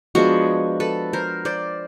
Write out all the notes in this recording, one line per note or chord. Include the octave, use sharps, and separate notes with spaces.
F3 G#3 B3 D4 F#4 G#4
A4 B4
A#4 C5
C5 D5